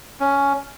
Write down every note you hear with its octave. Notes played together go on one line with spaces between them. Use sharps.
C#4